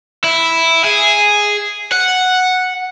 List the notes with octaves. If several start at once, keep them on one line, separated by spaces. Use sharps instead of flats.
E4
G#4
F#5